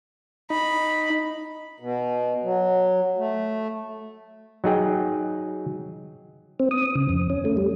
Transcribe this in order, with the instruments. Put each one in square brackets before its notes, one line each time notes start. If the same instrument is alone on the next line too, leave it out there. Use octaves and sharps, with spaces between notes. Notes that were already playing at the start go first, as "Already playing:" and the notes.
[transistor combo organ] D#4 [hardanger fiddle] B5
[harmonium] B2
F#3
A3
[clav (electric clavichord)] F#3 D#4 G#4 G5
[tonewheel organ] C4
D#6
C#3
F2
C#4
A3
G3